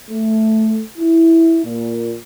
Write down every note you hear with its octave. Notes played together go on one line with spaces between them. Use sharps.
A3
E4
A#2